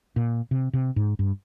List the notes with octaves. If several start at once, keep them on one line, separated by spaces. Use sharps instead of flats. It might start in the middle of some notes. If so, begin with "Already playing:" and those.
A#2
C3
C3
G#2
G2